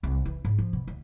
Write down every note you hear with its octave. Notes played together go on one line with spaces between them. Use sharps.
C2
E3
G#2
F3
B2
D2